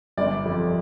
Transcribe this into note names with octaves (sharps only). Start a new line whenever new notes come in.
G1 D5
F2